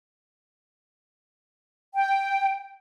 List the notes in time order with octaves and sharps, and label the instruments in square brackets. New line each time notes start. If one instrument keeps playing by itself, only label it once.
[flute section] G5